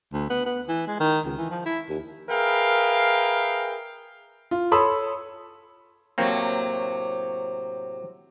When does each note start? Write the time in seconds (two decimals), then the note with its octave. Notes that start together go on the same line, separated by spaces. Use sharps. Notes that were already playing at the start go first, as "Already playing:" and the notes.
0.13 D2
0.30 B3
0.46 B3
0.69 E3
0.88 G#3
1.00 D#3
1.26 C#2
1.38 E3
1.50 F3
1.66 E4
1.89 D#2
2.30 G#4 A#4 B4 E5 F5 G5
4.51 F4
4.72 A4 C#5 B5 C6 D#6 E6
6.18 A2 C3 F#3 A#3 C4 C#5